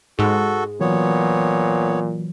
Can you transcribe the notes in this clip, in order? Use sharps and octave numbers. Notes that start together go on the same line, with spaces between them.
G#2 G#3 F#4 G#4 A4
A#2 E3 F#3 B3 C#5